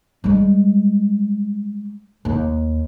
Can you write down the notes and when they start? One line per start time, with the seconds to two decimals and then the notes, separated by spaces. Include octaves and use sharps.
0.24 G3 G#3
2.25 D#2